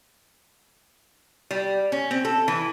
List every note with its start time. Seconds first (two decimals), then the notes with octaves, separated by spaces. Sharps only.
1.51 G3
1.92 C#4
2.11 C4
2.25 A4
2.48 E3